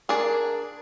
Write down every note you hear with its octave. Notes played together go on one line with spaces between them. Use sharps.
D4 G#4 A#4